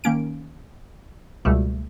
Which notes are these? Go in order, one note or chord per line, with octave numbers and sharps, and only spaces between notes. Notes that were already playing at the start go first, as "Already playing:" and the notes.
D#3 A#3 C#4 D7
C#2 B2 G3 A3